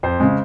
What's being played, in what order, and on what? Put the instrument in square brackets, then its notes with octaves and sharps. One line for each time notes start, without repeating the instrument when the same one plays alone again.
[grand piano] F2 C5
C#3 G#3